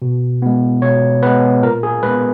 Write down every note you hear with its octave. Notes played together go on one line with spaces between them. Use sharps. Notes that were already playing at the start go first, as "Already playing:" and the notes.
B2
G#3 B3
B2 C#5
G#3 B3 B4
A#2 A#4
G#4
G#3 B3 B4